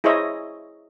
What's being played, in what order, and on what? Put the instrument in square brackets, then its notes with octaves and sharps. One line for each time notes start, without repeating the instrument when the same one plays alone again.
[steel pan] E4 G#4 C5 C#5 D#5 E5